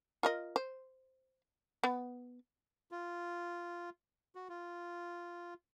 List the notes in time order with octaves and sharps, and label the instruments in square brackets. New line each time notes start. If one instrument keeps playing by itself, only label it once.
[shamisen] F4 A#4 D#5
C5
B3
[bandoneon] F4
F#4
F4